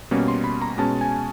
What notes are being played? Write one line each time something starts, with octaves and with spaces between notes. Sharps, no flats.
B2 G3 A#3 C#4
C6
B5
A#5
B2 G#3 C#4 A5
G#5